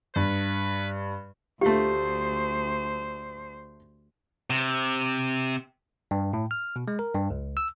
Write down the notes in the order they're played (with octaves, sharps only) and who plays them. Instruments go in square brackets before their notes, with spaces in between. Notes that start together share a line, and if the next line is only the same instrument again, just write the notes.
[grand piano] G2 [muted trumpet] B4
[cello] D2 C5 [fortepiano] A3 F4 [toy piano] G4
[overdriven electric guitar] C3
[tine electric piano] G2
A2
F6
B2
G#3
A#4
G2
C#2
E6